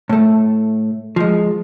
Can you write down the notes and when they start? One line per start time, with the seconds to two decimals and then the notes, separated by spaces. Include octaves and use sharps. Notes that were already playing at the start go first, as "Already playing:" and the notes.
0.09 A2 A3
1.16 F3 G#3